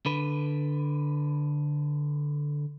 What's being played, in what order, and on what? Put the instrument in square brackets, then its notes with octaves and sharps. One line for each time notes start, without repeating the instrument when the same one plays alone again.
[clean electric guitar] D3 B4